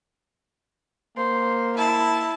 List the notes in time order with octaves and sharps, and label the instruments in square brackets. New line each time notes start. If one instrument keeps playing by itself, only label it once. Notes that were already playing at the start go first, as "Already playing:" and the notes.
[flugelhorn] A#3 [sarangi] C5
[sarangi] E4 [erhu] A5